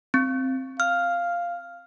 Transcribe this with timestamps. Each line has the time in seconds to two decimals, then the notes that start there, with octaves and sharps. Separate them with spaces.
0.14 C4
0.80 F5 F6